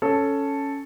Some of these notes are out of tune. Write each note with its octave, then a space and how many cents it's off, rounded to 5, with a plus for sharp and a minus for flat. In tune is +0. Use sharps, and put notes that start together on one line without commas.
C#4 +0 A4 +0